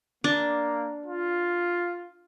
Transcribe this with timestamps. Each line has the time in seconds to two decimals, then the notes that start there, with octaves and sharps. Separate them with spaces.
0.24 A#3 D4
1.06 F4